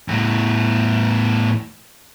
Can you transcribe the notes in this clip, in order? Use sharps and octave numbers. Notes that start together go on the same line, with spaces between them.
E2 A2